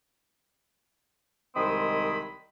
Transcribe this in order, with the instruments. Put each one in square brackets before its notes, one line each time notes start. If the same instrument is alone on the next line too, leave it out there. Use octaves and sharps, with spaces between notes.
[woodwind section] C2 D#3 G#3 C4 B5 D#6